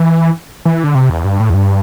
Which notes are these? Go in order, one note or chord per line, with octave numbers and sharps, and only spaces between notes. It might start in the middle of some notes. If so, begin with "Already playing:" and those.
Already playing: E3
E3
D3
C3
E2
G2
A2
E2
G2